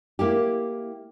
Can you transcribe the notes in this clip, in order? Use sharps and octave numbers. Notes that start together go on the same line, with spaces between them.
A#3 E4 G4